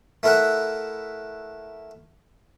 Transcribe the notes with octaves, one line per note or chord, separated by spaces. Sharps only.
A3 E4 A#4 E5 F#5